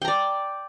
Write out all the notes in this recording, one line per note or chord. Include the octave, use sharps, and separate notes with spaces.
D5 G5 A#5